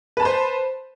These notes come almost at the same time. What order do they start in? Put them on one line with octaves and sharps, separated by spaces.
B4 A5 B5 C5